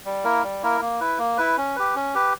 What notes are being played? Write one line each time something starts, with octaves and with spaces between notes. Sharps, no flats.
G3
A#3 E4 A#4
G3
A#3 E4 A#4
A#3
E4 B4
A#3
E4 B4
C#4
G4 B4
C#4
G4 B4